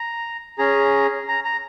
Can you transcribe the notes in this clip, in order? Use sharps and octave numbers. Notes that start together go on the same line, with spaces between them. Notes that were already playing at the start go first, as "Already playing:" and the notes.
Already playing: A#5
C#4 G#4 A#5
A#5
A#5